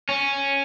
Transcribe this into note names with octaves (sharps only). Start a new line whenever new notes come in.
C#4